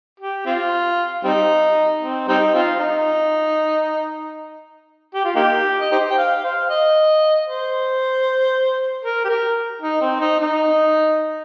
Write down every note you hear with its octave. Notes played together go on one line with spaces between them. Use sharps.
G4
C4 F4
G3 C4 D#4
C4
G3 C4 D#4
C4 F4
D#4
G4
F4
A#3 D#4 G4
D#5
D#4 G4 C5
G5
F5
C5 F5
D#5
C5
A#4
G4
A#4
D#4
C4
D#4
D#4